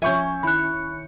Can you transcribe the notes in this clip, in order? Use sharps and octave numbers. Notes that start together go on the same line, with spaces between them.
F3 C#4 E5 G#5 C#6 G6
D#3 E4 B5 F#6 C#7